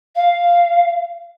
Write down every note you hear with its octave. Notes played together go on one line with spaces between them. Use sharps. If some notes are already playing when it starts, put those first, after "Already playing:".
F5